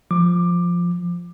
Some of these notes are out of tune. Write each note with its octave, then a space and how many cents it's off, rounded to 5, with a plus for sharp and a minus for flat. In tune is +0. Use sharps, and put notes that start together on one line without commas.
F3 +0 D6 +15